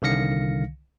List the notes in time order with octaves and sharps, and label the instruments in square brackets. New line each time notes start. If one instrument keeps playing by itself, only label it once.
[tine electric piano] C2 D3 D#3 F5 A#6 C#7